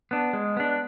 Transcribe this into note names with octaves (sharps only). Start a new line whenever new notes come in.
B3 D4
G#3
B3 D4